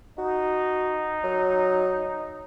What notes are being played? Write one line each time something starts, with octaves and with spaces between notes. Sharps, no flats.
D#4 F#4
F#3